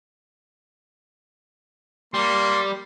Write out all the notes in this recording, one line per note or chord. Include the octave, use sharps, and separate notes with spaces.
G3 A#3 C6